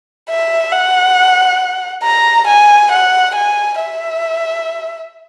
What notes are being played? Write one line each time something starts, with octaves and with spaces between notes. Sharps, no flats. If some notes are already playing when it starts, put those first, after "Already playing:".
E5
F#5
A#5
G#5
F#5
G#5
E5